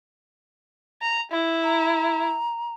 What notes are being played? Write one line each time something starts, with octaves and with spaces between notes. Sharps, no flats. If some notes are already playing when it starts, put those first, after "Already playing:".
A#5
E4
A#5